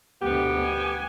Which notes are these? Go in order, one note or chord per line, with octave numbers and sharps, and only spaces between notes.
D2 B2 B3 G4
G#5